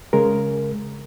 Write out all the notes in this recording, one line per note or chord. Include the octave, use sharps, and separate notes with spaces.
C#3 G#3 A#4